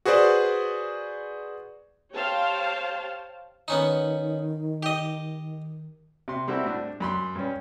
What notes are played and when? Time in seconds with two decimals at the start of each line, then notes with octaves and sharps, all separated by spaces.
0.05 F#4 G#4 B4 C5 D5
2.14 G4 C5 C#5 F5 G5 A5
3.68 D#3 B3 C#4 D#4
4.83 G4 D#5
6.28 C3 C6
6.48 G3 C4 E4 F#4 A4
6.64 A2 D4
7.00 F#2 B5 C6
7.36 G2 C#4